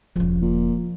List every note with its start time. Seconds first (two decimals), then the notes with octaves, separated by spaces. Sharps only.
0.16 E1 C#3 F3
0.42 A#2